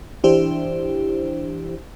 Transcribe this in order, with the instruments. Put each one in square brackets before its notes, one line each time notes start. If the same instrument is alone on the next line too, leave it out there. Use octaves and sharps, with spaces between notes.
[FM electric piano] E3 D4 E4 G4 C5